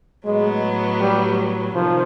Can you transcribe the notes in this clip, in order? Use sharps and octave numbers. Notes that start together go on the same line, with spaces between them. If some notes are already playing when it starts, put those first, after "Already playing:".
A2 F#3 G#3 B3
G3
C3 D#3 F3